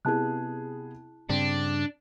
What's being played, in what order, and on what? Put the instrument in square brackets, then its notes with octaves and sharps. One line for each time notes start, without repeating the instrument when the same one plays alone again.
[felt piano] C3 B3 G#4 [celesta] E4 A5 F#6
[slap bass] G2 C#3 [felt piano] C4 [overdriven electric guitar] D4